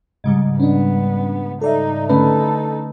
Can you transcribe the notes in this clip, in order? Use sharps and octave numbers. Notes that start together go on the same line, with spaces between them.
G#2 C#3 G3
B3 C#4 D4
D#4 A4 D5 E5
D3 A3 C#4 D#4 A4 B4